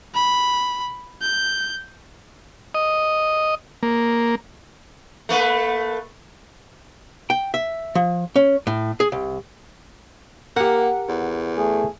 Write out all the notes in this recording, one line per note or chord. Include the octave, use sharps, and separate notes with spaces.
B5
G6
D#5
A#3
A3 A#3 B4
G5
E5
F3
C#4
A2
G#4
C2
A#3 G4 A#4 F#5
E2
A3 G#4